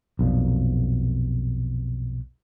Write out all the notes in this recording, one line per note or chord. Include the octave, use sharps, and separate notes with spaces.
B1 F2 A#2